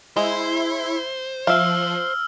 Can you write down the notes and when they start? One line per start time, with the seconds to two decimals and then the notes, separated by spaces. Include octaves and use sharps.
0.16 G#3 E4 C5
1.47 F3 E5 F5 E6 F6